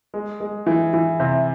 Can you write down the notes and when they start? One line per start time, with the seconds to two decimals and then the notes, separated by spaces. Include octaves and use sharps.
0.14 G#3
0.40 G#3
0.67 E3
0.94 E3
1.20 C3